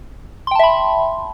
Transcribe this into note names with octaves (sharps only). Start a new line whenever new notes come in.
E5 G5 A5 B5 C6